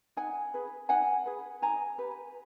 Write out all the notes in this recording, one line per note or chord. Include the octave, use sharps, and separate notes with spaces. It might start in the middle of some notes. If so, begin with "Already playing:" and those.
D#4 F#5 G#5
G#4 B4
D#4 F#5 G#5
G#4 B4
D#4 G#5 A#5
G4 B4